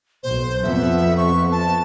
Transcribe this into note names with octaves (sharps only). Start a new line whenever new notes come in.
B1 C5
F2 F3 B3 E5
C#6
A5